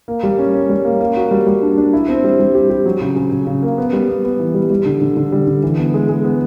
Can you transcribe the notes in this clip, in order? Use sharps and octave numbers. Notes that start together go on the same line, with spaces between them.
A#3
G3
C#4
C#4
G3
A#3
A#3
F#4
G3
G3
D4
D4
E4
C4
G3
G3
G4
G4
F#3
C#3
C#3
C#3
C#3
A#3
B3
G3
B3
B3
E3
G3
G3
D3
D3
D3
G3
D3
E3
B3
G#3
G#3
B3